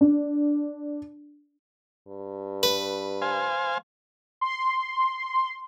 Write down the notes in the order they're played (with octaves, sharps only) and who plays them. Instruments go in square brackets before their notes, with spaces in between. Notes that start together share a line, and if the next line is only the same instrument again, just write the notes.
[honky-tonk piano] D4
[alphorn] G2
[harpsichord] B4
[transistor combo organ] C5 F5 G#5
[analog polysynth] C6